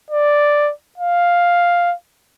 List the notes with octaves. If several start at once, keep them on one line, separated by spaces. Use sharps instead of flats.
D5
F5